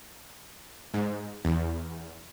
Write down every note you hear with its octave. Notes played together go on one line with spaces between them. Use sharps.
G#2
E2